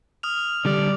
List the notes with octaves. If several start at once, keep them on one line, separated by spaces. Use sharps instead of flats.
D#6 F6 F7
D3 G3 D4 D5